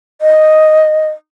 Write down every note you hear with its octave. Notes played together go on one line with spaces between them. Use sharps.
D#5